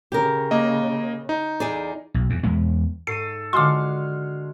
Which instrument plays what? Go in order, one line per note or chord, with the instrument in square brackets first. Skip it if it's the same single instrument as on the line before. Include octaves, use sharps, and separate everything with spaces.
[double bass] C#3 [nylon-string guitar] G4 A#4
[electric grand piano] A#3 D#5
D#4
[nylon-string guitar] E2 G#4 D5
[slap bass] B1
E2
E2 G#3 B3
[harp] G#2 C#6 D#7 [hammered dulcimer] A4 [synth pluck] C7
[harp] D3 F4 F#4 [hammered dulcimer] G#3 F5 [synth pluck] C6 D6